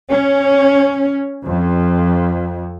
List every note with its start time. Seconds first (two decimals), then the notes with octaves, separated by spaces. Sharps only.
0.11 C#4
1.46 F2